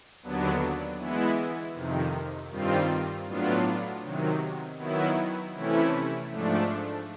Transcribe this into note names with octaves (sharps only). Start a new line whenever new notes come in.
D#2 D3 F#3 B3 D4
E3 G#3 B3 E4
F2 C3 D#3
G2 D#3 G3 C4 F4
A2 F#3 B3 D4 F4
C3 D#3 F#3
D#3 F#3 B3 E4
C3 E3 A3 C#4 E4
G#2 F3 A3 D4